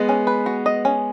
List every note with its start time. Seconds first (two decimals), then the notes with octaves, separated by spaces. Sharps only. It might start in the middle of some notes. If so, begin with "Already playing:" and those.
Already playing: G#3 B3 D#5
0.09 C#4
0.27 B4
0.46 F#4
0.66 D#5
0.85 C#4